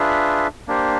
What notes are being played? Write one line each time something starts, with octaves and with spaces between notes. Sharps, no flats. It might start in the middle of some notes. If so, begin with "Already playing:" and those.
Already playing: D4 F4 G#4 B4 E5
A#3 D4 G4 C5